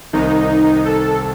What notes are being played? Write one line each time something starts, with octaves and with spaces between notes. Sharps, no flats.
C2 C3 D#3 D#4
A4